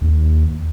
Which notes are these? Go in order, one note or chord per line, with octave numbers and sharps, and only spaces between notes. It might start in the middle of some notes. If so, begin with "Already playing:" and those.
D#2